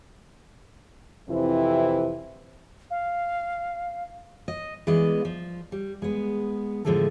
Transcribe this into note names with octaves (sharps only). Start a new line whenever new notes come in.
F2 C3 E3 C4 E4
F5
D#5
E3 G#3 B3 D5 D#5
F3
G3
G#3 B3
A2 D3 F3 G#3 A3 A4